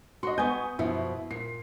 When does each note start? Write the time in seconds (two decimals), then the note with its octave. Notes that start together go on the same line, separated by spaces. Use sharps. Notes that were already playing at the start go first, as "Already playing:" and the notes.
0.23 F#4 D#5 C6
0.38 B3 G#5 C#6 D#6 G6
0.79 F#2 B2 F3 E4
1.31 A#2 C7